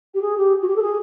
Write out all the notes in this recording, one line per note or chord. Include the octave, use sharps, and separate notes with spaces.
G4
G#4
G4
F#4
G4
A4
G#4